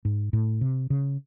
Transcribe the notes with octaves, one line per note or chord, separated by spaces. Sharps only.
G#2
A2
C3
C#3